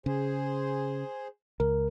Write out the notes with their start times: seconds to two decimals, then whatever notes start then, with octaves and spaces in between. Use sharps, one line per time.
0.06 C#3 G#4 C5
1.60 C#2 A#4